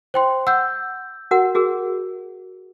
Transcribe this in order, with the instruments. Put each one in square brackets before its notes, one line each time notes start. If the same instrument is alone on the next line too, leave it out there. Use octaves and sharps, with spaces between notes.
[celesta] C5 G5 C6
[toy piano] F#5 [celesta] E6 G6
[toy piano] F#4 A#4 F#5
F#4 G#4 A#4